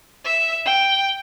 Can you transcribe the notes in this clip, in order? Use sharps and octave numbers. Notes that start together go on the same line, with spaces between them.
E5
G5